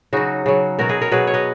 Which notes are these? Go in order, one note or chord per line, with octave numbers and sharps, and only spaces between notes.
C#3 F#3 D#4 F#4
C#3 F#3
B2 F#3 F#4 A#4
G#4 B4
A#4 C#5
B2 F#3 G#4 B4
C#5
B4 D#5